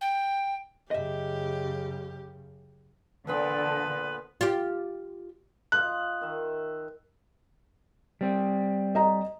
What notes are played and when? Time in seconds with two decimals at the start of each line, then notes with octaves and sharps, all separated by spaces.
0.01 G5
0.91 F#2 C#3 G4 D#5 E5
3.27 A#2 D3 F3 B3 A4 B4
4.41 F4 G4
5.72 F4 D#5 F5 F#6
6.21 D#3 E5
8.21 G3 C4
8.95 D#5 A#5